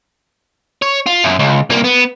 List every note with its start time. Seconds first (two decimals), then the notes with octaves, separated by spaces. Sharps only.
0.82 C#5
1.07 F4
1.24 F#2
1.39 C#2
1.70 C2 A#3
1.84 B3